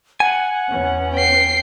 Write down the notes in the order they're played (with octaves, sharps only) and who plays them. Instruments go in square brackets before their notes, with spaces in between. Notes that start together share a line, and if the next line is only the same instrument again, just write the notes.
[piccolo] F#5 [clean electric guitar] G#5
[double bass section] E2 B3 C#4
[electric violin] G5 C7